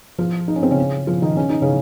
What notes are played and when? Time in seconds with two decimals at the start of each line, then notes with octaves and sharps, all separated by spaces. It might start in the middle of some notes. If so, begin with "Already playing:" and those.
0.19 F3 F4
0.48 D#4
0.56 C#4
0.63 C4
0.71 C#3 C#4
1.07 F3 F4
1.22 D#3 D#4
1.37 C#4
1.50 D#4
1.62 C#3 C#4